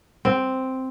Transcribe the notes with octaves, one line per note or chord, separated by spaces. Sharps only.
C4